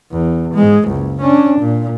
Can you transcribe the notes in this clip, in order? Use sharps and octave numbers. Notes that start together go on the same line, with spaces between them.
E2
G#2 G#3
F#1 C#2
C#4 D4
A#2